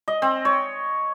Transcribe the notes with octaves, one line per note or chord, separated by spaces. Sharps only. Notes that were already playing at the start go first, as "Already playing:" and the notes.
D#5
C4
C#5